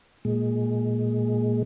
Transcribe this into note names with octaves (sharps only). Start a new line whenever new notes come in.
A#2 G#3